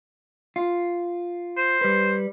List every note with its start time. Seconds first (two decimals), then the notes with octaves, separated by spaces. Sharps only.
0.56 F4
1.57 C5
1.81 G3 B4